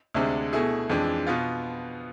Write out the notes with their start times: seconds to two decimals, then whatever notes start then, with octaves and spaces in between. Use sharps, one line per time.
0.14 D2 C3 G#3 D4 G#4
0.53 B2 A3 E4 G#4
0.90 F2 E3 G#3 D4
1.27 B2 B3 F4